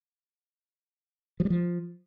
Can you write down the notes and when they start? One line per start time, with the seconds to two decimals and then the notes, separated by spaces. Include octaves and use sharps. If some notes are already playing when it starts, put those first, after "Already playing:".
1.40 F3
1.45 G3
1.50 F3